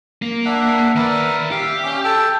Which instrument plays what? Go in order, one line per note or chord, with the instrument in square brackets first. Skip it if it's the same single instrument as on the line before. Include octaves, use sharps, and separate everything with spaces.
[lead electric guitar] A#3
[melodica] D4 E5 F#5
[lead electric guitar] D#3 D5 [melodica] A#4 B4 E5
[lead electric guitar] G4 [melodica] E5 F5
[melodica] C#4 D6
A4 G5 E6